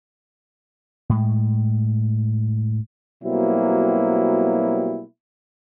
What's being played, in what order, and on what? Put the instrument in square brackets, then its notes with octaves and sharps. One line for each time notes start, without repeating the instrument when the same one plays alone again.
[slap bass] A2 G#3
[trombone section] B2 F#3 G3 A#3 C4 E4